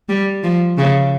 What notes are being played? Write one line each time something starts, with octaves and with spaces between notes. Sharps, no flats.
G3
F3
C#3